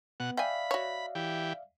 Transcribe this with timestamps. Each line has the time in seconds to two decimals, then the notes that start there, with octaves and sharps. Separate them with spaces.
0.20 B2 B3 F#5
0.37 D5 E5 F5 G5 G#5 B5
0.71 F#4 C#5
1.15 E3 G4